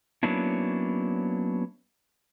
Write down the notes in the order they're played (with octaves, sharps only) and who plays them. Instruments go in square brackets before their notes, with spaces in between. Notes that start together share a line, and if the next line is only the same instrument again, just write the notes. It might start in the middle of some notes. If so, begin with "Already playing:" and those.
[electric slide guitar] F#3 A#3 B3 C#4 D4 E4